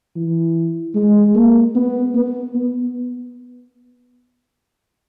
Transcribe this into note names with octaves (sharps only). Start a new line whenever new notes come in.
E3
G#3
A#3
B3
B3
B3